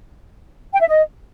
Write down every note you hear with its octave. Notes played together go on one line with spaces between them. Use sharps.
G5
E5
D#5